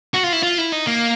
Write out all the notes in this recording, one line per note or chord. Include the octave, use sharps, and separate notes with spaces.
F#4
F4
E4
F4
E4
D#4
A#3